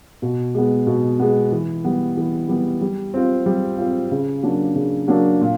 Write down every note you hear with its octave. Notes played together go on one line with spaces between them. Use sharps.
B2
G#3 B3
B2
G#3 B3
E3
G3 B3
E3
G3 B3
G3
C4 F4
G3
C4 F4
C#3
F#3 A#3 D4
C#3
F#3 A#3 D4
A#2